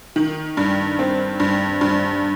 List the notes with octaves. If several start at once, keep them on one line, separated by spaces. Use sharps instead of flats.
D#3
G2
C4
G2
G2